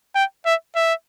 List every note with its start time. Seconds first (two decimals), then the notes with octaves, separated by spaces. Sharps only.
0.15 G5
0.46 E5
0.75 E5